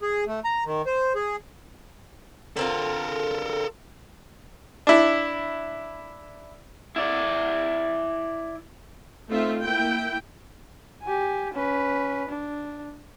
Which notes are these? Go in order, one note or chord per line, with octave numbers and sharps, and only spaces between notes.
G#4
A3
A#5
D#3
C5
G#4
D3 C4 F4 A4 A#4
D4 E4
E4 D5
A3 C4 D#4 F4 E5
A#3 E4 G5
G4 G#5
C#4 B4
D4